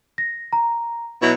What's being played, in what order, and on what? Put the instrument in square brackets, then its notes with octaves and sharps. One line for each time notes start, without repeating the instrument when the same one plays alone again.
[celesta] A#6
A#5
[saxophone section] B2 F#3 E4